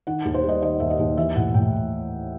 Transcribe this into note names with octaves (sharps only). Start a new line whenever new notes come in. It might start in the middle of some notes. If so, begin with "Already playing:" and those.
D#3 F#5
D#2
C5
G3 D#5
D#3 D#5
D#2 E5
D#5
D#2
E3 E5
A2 F#5
A2 G5